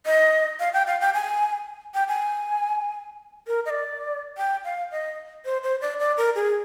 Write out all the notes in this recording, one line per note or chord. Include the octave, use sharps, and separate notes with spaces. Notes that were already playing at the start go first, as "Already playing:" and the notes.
D#5
F5
G5
F5
G5
G#5
G5
G#5
A#4
D#5
D5
G5
F5
D#5
C5
C5
D5
D5
A#4
G#4